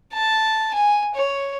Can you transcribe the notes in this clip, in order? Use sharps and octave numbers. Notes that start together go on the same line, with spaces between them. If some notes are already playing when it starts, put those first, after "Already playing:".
A5
G#5
C#5